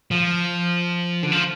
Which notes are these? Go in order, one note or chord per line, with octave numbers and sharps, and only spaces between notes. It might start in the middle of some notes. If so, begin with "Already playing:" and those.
F3
D3
F3